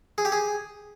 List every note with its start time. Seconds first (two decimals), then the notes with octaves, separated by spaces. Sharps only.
0.18 G#4
0.25 G4
0.32 G#4